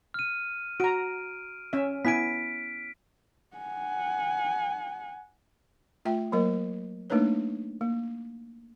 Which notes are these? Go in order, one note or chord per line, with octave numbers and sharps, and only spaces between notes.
F6 D#7
F#4 A#5 D7
C#4 E5
B3 E4 G#5 B6 D7
F#5 G#5
A3 F4 E5 G5
F#3 A#3 A#4 D#5
A3 A#3 D4 D#4 B4 C#5
A#3